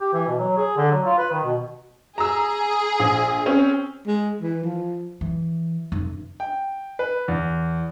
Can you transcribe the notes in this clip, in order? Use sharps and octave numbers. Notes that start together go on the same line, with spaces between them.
G4
E3
B2
F#3
G#4
D3
F#3
F4
B4
D#3
B2
G#4 A#5 E6
A#1
C4 C#4
G#3
E3
F3
E3
F1
G5
B4
E2